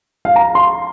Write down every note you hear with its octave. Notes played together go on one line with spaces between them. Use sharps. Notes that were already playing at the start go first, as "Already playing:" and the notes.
F5
A#5
C6